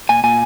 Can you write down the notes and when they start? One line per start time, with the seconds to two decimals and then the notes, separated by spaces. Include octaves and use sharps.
0.09 A#2 G#5
0.24 A#2 G#5